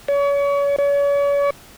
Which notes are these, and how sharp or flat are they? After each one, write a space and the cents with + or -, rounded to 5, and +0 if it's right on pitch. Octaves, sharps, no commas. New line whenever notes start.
C#5 +35
C#5 +40